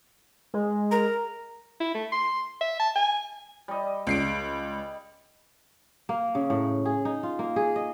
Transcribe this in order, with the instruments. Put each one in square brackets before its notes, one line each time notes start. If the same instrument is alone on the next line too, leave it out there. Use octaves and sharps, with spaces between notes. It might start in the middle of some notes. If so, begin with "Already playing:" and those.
[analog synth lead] G#3
[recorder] A#4 [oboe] A#5
[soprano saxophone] E4
A3
C6
E5
A5
G#5
[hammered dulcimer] G3 D#5
[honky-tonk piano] C#2 C7 D7
[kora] A#3
C#3
A2
G#4
D#4
F4
A#3
G#4
D#5